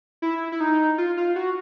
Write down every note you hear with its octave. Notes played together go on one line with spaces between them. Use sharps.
E4
E4
D#4
F4
F4
F#4